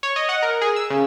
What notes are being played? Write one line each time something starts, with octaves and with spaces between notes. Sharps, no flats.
C#5
D#5
F#5
A#4
G#4
E6
C#3